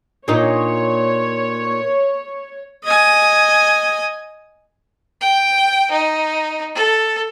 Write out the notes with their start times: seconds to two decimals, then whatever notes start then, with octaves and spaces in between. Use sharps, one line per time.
0.28 A#2 D#4 C#5
2.85 D#5 G#5
5.21 G5
5.91 D#4
6.75 A4